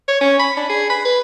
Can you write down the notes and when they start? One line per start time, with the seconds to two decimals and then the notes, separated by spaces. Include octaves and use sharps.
0.09 C#5
0.21 C#4
0.40 B5
0.57 D4
0.70 G#4
0.90 B5
1.05 B4